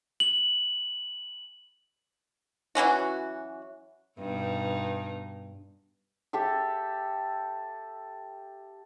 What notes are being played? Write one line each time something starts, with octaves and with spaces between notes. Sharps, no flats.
F#7
E3 F#3 C#4 F#4
G2 B2 D#4
G4 A4 E5